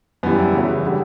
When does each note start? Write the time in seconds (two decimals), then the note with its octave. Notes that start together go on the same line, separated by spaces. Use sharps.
0.23 F#2 E3 G3 B3
0.39 E4
0.53 E2 C#3 F#3
0.85 D3 G3